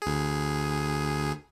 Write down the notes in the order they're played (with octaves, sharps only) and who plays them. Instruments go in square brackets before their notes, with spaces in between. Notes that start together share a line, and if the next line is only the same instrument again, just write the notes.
[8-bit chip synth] D2 G#4